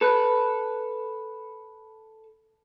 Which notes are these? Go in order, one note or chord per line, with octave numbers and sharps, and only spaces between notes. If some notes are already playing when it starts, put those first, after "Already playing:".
A4 B4